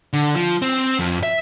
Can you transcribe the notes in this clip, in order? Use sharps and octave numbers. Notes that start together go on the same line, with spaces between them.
D3
F3
C4
F2
E5